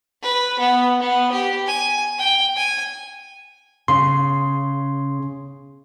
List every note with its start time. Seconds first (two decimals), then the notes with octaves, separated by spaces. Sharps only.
0.23 B4
0.60 B3
1.00 B3
1.32 G4
1.67 G#5
2.19 G5
2.56 G#5
3.88 C#3 C6